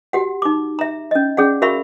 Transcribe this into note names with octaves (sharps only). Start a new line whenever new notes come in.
F#4 G4 F#5
D#4 D6
E5 A#5
C#4 D#5
C#4 G#4 D5 F#5
F#4 A#4 E5 F5 B5 C#6